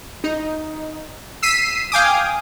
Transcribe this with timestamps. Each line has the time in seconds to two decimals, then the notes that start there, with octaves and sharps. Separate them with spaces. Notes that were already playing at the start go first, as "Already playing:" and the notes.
0.24 D#4
1.42 E6 B6 C7 D#7
1.92 F5 G5 G#5 D6 D#6